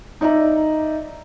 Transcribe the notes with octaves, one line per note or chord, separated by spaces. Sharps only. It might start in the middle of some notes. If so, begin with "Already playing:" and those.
D#4 D5 E5 A#5